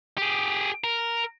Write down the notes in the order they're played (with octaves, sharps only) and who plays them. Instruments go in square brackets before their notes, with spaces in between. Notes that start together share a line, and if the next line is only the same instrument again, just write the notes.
[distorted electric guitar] G4 G#4
A#4